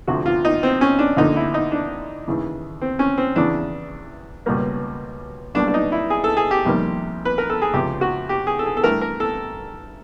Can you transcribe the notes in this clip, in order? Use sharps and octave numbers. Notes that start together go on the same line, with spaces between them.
D2 C3 F3 F#4
F4
D#4
C4
C#4
D4
D2 D3 F3 A#3 D#4
E4
D#4
D4
D#2 C#3 E3
C4
C#4
C4
E2 C#3 E3 D4
C#2 B2 G3 A#3
B1 B2 G3 A#3 D4
D4
D#4
E4
G#4
A4
G#4
G4
F2 C3 D#3 G3 A#3
B4
A#4
A4
G#4
C#2 C3 F3 G4
F#4
G4
G#4
A4
G#4
A4
G2 E3 A3 A#4
A#4
A4